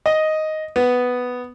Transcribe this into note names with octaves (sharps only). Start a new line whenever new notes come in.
D#5
B3